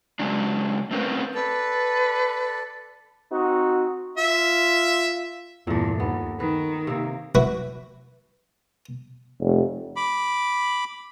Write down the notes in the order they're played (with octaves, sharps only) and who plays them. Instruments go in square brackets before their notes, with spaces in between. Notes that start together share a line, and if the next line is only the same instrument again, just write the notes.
[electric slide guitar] C#3 F#3 G#3 C#4 D4
A3 C4 C#4 A#4 B4
[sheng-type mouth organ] A4 D5 [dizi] B4
[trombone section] C4 D#4 F#4
[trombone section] F4 [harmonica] E5
[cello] E2 G2 [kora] A#2 A3
[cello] D#2 [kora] B3
[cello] D#3 [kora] B4
[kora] C3 A#3
[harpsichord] E4 F#4 B4
[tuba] F1
[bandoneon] B5 D6